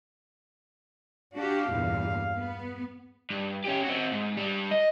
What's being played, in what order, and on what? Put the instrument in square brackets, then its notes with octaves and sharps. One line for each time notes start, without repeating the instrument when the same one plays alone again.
[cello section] D4 F#4 G4 [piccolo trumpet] F5
[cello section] E2 G2 A#2
B3
[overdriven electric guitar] G2
C#4 G4
C4 F#4
G#2
G2 G3
D#5